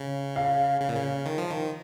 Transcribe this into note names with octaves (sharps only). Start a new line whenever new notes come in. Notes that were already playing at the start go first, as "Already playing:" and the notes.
Already playing: C#3
F5
C#3
A#2
C#3
D#3
F3
D#3